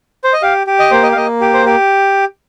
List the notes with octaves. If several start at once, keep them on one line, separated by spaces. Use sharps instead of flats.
C5
D#5
G4 F5
G4
D#5
A#3 C5
D#5
F5
A#3 D#5
G4
C5
G4